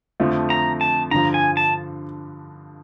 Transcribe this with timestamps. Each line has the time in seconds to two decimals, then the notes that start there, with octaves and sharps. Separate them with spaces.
0.20 F2 D3 F3 A3
0.50 A#5
0.81 A5
1.11 G2 D3 F3 A#5
1.34 G#5
1.57 A5